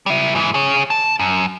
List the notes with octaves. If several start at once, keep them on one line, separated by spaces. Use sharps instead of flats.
G3 E5
G#2 E3
G#4 C#5
A5
F#2